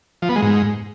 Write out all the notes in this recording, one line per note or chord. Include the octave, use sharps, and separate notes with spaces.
F3
B3
G#3
G#2